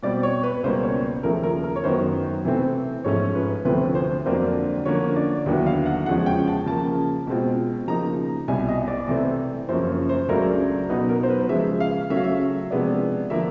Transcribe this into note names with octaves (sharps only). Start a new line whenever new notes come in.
B2 G3 C4 D5
C#5
B4
C#2 B2 G3 A#3 C5
C#5
D#2 C#3 F3 A3 A#4
A#4
A#4
C#5
F#2 D#3 F#3 B3 C5
C3 E3 A3 C4
G#2 F3 A3 C#4 F4 C#5
B4
D2 C3 F3 A3 C4 B4
C5
F2 D3 F#3 A#3 D4 C5
D3 F3 A#3 C#4 C#5
D5
D#2 D3 F#3 B3 E4
F5
F#5
E2 C#3 F3 G#3 C#4 F#5
G5
A5
C#3 F3 A#3 A5
B2 G#3 C4 F4
C#3 F3 A#3 D#4 A#5
C2 B2 G3 G#5
D#5
D5
C3 E3 A3 C4
F#2 C#3 F3 A#3 C#4 C5
C5
C#2 C#3 F#3 A3 D4 A#4
B2 F#3 B3 D#4 B4
A#4
C5
B4
C#3 F3 G#3 E5
F5
C#3 F#3 A3 C#4 E5
F5
E5
C3 F3 G#3 B3 D4
D3 F3 A#3 E5